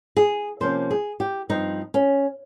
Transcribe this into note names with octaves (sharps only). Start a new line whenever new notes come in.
G#4
C3 F3 A#3 C#4 C5
G#4
G4
G2 F3 C4 D#4
C#4